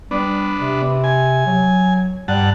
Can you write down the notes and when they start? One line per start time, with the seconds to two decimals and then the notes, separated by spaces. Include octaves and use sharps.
0.11 G3 B3 D4
0.60 C3
1.04 G#5
1.46 F#3
2.28 G2 G3 F#5 A5